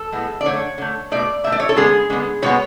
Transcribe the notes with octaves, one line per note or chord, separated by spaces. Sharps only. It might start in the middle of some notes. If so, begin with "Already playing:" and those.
Already playing: A4
A2 G#3 B3
D5
D3 A3 C#5
D3 A3
B2 A3 D5
B2 A3 E5
D5
C#5
A4
D3 G#3 B3 G#4
D3 G#3 B3
B2 G#3 B3 C#5